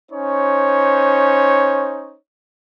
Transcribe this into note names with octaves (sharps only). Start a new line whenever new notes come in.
C#4 D#4 C5 C#5